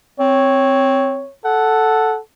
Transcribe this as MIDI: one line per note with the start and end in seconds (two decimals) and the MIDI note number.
0.20 1.25 60
0.20 1.34 73
1.45 2.20 69
1.45 2.16 78